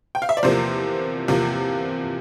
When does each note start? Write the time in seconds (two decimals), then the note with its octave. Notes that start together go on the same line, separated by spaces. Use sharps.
0.15 G5
0.22 F5
0.29 E5
0.37 D5
0.43 E2 C3 F3 A#3 C5
1.28 E2 C3 F3 A#3